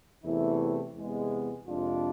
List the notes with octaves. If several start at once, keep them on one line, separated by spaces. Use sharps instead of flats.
E2 C3 E3 A3 E4
E2 C3 G#3 B3
F2 C3 G#3 D4 F4